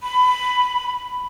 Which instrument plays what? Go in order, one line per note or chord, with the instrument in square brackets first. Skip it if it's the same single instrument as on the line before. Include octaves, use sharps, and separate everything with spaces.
[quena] B5